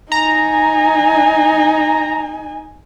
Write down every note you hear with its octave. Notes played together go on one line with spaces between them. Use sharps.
D#4 G#5 A#5